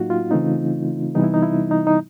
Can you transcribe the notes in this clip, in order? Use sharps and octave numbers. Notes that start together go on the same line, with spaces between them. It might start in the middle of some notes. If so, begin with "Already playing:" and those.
Already playing: A2 F#3 A#3 D#4 F4 F#4
F4
C#3 E3 A3 C4 D#4
C3 E3 G3 B3 D#4
E4
D#4
E4
D#4
D#4